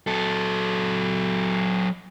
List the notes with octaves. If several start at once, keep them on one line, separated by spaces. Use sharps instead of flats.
F#3 A4